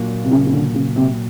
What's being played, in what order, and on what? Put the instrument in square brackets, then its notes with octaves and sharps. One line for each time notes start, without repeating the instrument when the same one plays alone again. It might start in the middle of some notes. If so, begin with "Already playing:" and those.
Already playing: [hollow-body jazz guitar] A#2 F#3 A#3 D4 F4
[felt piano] C3
C#3
C#3
D3
C#3
C3